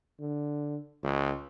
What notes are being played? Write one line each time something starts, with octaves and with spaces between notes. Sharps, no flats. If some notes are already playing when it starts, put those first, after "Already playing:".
D3
C#2